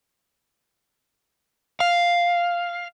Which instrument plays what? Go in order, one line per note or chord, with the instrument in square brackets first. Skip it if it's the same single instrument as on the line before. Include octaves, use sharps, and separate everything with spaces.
[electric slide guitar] F5